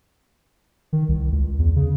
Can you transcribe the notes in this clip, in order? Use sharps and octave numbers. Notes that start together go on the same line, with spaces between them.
D#3
C2
C#2
E2
C#3